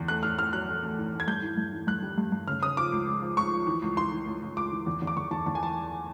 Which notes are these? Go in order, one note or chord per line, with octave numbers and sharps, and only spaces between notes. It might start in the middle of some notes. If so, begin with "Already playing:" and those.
Already playing: E2
A3 F#6
A2 F6
A2 F6
F#3 F#6
A3
A3
A2
A3
G#6
G2 G6
E3
G2
E3
G2 F#6
G3
G2
G2
C#3 F6
C#3 D#6
F3 D6
C#2
C#2
F3
C#2 C#6
F3
E3
C#2
E3 C6
E3
C#2
C#2
C#2 D6
E3
E2
E2
D6
E2 C#6
E2 A5
E2 A5
G#5
A5